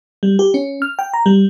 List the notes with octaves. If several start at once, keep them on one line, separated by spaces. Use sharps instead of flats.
G3
G4
C#4
F6
G5
A#5
G3